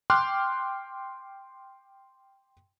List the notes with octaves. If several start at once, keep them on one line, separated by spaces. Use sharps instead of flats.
G5 C6 D6 F6 F#6